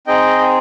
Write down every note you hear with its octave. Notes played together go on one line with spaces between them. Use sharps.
C4 D#4 G#4 D#5 G5
G5